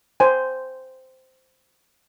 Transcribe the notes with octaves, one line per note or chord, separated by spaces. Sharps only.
C5 G#5